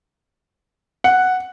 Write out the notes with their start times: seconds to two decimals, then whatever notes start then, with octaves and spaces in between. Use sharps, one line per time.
1.04 F#5